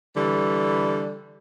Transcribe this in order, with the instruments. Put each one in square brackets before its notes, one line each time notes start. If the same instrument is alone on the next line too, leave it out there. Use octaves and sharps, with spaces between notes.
[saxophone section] D3 E3 G3